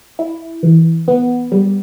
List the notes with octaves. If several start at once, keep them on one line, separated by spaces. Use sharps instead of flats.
E4
E3
B3
G3